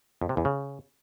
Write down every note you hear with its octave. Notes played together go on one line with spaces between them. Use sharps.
F2
C3
E2
C#3